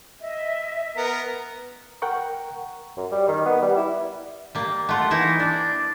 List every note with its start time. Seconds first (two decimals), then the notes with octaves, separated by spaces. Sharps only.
0.21 D#5 E5
0.97 B3 A#4
2.02 A#4 F#5 G5 A#5 C#6
2.97 F#2
3.11 G3
3.28 D#3
3.45 B3
3.62 G3
3.77 E4
4.55 G3 A#3
4.89 A3 F4 F#5
5.11 E3 A#3 D#4 E4
5.40 D4 D5